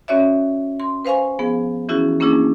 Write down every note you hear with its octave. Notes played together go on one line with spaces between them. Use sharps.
C#4 F#4 C#5 D5 E5
C6
B4 C5 F5 G#5 C#6
F3 B3 G#4
E3 C#4 E4 F#4 G#4
A#3 C#4 D4 E4 G#4